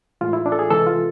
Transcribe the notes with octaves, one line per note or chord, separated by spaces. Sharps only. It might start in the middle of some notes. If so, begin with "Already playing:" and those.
A2 E3 G#3 F4
E4
D4
A4
G#4
C3 E3 G#3 A4
F4